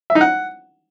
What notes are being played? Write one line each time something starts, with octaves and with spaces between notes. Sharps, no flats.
E5
D#4
F#5